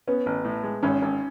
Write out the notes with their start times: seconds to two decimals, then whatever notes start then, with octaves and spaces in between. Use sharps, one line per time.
0.07 B3 C#4
0.26 A1
0.45 A2
0.63 G#3
0.83 G#1 C#4
1.02 G#1